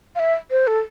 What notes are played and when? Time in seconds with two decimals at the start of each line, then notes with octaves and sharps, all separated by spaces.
0.16 F5
0.19 E5
0.51 C5
0.67 A4